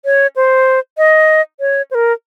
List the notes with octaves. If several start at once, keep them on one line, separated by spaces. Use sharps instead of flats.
C#5
C5
D#5
C#5
C5
A#4